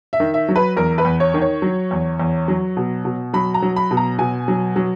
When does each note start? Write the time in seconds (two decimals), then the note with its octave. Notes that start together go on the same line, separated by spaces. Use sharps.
0.13 E5
0.20 D#3
0.34 E5
0.49 F#3
0.56 B4
0.77 E2 A#4
0.98 B4
1.05 E2
1.20 C#5
1.34 D#3
1.41 C#5
1.62 F#3
1.91 E2
2.20 E2
2.48 F#3
2.77 B2
3.05 B2
3.33 F#3 B5
3.54 A#5
3.62 F#3
3.76 B5
3.91 B2
3.97 A#5
4.19 B2 G#5
4.48 F#3
4.76 F#3